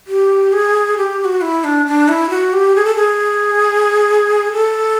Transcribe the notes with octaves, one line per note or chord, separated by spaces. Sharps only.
G4
G#4
G4
G4
F#4
E4
D4
D4
E4
F#4
G4
G#4
A4
G#4
A4